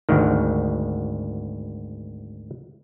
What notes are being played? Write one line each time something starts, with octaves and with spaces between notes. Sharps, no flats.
G#1 D2 D#3